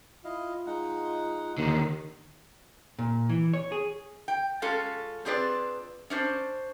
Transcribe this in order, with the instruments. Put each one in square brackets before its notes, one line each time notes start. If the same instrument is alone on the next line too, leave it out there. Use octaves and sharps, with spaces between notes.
[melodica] E4 D#5 F5 [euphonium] F4
[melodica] G#3 D#4 F#5
[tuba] D#2 [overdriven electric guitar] D3 D#3 [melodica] D#4 A#4
[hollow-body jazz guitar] A#2
E3
C#5
G#4
[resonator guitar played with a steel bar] G5
G#3 C#4 F4 A4
C4 D4 F4 G#4 B4 D5
C#4 D4 C5